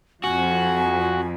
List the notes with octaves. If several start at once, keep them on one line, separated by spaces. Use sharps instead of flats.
F2 F#4 G#5